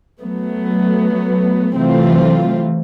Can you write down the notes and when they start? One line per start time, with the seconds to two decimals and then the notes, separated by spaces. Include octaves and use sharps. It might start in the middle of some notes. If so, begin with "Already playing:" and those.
0.21 F#3 A3 B3
1.72 C3 E3 F#3 A3 C4 F4